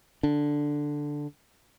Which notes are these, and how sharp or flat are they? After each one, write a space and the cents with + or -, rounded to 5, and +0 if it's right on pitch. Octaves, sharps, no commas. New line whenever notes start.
D3 +0 D4 +0